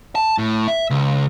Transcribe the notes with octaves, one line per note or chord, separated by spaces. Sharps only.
A5
A2
E5
C#2